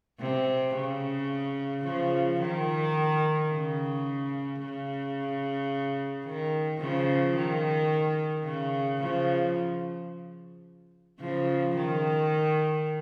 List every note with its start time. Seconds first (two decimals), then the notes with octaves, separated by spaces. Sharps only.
0.20 C3
0.74 C#3
1.84 C#3 F3
2.40 D#3
3.49 C#3
4.60 C#3
6.25 D#3
6.80 C#3 F3
7.35 D#3
8.45 C#3
9.00 C#3 F3
11.20 C#3 F3
11.75 D#3